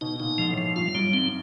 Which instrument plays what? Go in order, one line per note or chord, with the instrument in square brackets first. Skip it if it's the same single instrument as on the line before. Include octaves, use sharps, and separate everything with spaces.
[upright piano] B2 [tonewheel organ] D#4
[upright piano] A#2 [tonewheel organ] D#4
[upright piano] G#2 [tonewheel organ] F3
[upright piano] A2
[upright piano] G#2 [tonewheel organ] F3
[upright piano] G2 [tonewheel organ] F4
[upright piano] F#2 [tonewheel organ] G3
[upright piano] G#2 [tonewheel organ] C4